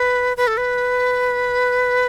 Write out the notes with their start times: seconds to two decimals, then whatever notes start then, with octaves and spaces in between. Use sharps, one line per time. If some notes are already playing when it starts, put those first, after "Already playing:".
Already playing: B4
0.37 B4
0.47 A4
0.57 B4